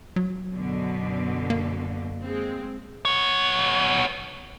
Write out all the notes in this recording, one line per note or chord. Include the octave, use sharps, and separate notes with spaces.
F#3
F#2 B2 D3
A#3
G#3 C4
B3 C#5